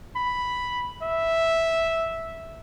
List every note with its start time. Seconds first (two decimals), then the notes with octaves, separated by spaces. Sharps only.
0.16 B5
1.02 E5